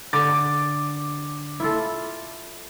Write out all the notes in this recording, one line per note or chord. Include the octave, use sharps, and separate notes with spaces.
D3 D6 A6
E4 F4 A4